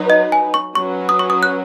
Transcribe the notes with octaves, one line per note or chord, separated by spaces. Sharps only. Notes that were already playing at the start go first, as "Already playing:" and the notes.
Already playing: F#3 D#4 B4
D#5
G#5
C#6
F#3 C#4 F#4 B4 C#6
D#6
C#6
D#6
F#6